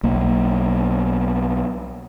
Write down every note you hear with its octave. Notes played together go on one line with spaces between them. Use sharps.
B1 A#3